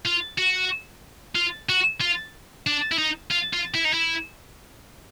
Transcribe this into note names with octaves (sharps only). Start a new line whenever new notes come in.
F4
F#4
F4
F#4
F4
D4
E4
D#4
F4
F4
E4
D#4
E4